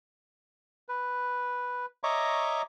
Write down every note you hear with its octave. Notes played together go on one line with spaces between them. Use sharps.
B4
C#5 D#5 E5 A#5 C#6 D6